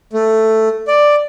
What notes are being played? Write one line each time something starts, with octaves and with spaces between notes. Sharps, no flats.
A3
D5